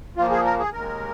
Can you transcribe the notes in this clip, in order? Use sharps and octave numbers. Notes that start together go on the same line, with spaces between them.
A#2 F3 A#3 F4
G#4
A#4
G#4
D#2 D#3 G#3 A#4